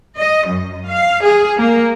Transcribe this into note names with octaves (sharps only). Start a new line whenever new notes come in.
D#5
F#2
F5
G#4
A#3